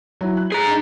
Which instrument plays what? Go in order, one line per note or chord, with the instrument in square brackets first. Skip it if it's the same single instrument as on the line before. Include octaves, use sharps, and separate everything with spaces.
[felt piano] F#3 E4
F#6
[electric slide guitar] G#4 A#5
[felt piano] D4 D#4